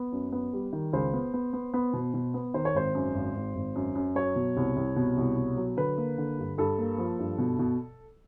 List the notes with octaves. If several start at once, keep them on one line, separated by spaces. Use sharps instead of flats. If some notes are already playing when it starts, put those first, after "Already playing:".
Already playing: B3
F#2
B3
G3
D#3
C#2 C5
B3
B3
B3
B3
B2
B2
B3
D#3 C5
C#5
G#1 C5
F#2
G#1
G#1
G#1
F#2
F#2
F#3 C#5
B2
C2
C2
B2
C2
B2
F#3
D3 B4
A#3
D3
G2
G2 A4
A#3
F3
G2
B2
B2